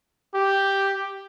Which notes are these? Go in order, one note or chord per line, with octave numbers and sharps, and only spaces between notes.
G4